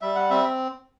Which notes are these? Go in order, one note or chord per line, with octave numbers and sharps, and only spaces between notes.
G3 E5
F#5
C4 E5